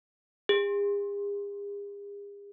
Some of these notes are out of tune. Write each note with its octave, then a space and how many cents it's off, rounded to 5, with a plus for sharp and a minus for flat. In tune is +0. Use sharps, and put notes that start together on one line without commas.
G#4 -45